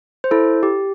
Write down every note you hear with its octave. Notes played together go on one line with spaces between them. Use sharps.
C5
E4 A4
G4